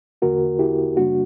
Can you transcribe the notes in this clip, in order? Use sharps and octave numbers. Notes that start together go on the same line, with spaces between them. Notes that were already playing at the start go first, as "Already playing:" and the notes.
E2 D3 A#3 F#4 A#4
E4 G4
F#2 C#3 G3 A#3 D4 F#4